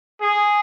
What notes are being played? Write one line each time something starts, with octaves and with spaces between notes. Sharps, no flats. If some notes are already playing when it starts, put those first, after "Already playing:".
G#4